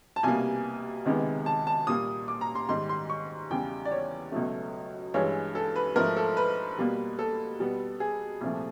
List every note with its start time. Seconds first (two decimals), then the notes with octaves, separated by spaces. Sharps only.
0.16 A5
0.23 C2 B2 G3 A#3 G#5
1.06 C#2 C3 D#3 G#3 B3
1.46 A5
1.67 A5
1.87 A#2 G3 A#3 D#6
2.28 D6
2.41 A#5
2.55 C6
2.69 G#2 D#3 G3 C6
2.89 C6
3.10 C#6
3.50 E2 C#3 E3 G3 G5
3.85 D5
3.91 C#5
4.32 C#2 B2 F#3 A3
5.14 G2 E3 G#3 C#5
5.55 A4
5.76 B4
5.96 G#2 F3 A3 A#4
6.16 A4
6.37 B4
6.78 B2 G3 A#3
7.19 A4
7.59 B2 G3 B3
8.00 G#4
8.41 C2 A#2 F3 A3